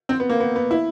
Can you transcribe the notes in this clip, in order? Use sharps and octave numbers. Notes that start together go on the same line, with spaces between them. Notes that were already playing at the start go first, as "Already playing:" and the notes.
C4
B3
A#3
B3
B3
E4